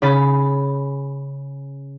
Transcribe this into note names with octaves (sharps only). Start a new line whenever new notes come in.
C#3 C#4 B5 A6